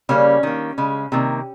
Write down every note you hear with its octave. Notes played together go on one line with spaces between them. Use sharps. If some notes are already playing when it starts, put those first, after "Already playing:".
C#3 G3 A#3 C#4
D#3 A#3
C#3 G#3
C3 D#3 A#3